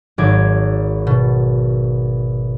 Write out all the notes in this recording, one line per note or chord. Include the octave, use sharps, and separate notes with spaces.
G#1 F#3 D6 G#6
B2